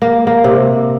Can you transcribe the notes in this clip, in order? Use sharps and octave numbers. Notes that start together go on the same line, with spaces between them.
A#3
A#3
C3